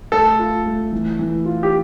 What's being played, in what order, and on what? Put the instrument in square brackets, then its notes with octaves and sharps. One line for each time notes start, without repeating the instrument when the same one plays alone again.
[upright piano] A3 [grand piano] A4
[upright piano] F4
A3
E3
E3
F4
[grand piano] G4